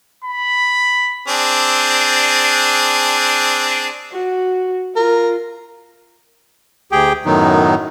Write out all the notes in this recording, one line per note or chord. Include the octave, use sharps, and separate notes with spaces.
B5
C4 D4 G#4
F#4
F4 A#4
D2 G4 G#4 G5
F#2 A2 D#3 F#3 B3 D#4